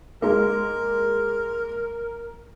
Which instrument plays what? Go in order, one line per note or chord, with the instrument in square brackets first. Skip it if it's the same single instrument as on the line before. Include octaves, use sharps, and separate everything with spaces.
[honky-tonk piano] G#3 A#3 [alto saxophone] A#4